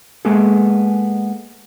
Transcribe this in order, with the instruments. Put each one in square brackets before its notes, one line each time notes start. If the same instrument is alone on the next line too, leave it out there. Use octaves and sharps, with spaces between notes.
[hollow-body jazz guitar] G#3 A#3 B3 G#4 A4